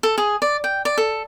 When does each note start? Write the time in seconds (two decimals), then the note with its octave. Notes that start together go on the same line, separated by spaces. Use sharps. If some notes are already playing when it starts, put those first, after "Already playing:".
0.03 A4
0.18 G#4
0.42 D5
0.64 G5
0.85 D5
0.97 A4